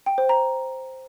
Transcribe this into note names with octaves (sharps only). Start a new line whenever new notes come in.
G5
C5
A#5